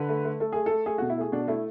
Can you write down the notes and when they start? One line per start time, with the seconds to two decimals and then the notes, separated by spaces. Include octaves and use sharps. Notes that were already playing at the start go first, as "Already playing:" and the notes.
Already playing: D3 B4
0.09 A3
0.25 A3
0.40 A3 A4
0.52 A3 G#4
0.66 A4
0.71 A3
0.86 A3 G#4
0.98 B2 F#4
1.10 E4
1.18 A3 G#4
1.32 B2 D4
1.48 A3 E4